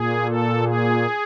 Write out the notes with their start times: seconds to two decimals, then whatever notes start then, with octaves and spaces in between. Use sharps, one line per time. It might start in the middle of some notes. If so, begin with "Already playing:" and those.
Already playing: A#2 G#4
0.26 A4
0.63 G#4